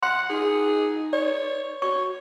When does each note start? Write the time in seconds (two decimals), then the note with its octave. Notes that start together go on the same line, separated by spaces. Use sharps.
0.03 F#5 C6
0.30 D#4 G#4
1.13 C#5 D5
1.82 F#4 C#5 C#6